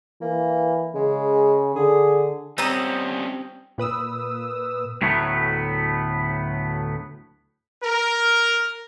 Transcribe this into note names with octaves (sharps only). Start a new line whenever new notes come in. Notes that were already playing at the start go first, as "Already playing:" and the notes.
E3 A#3
C#3 G#3
D3 G#4
G3 C4 C#4 A#5 D#6
A#2 B4 D#6 E6
D2 A2 F#3 A3 B3
A#4